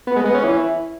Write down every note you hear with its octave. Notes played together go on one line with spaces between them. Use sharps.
B3
G#3
B3
C#4
E3